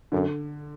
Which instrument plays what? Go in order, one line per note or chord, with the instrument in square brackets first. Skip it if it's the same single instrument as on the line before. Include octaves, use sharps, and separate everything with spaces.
[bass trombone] F#2 [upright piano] D3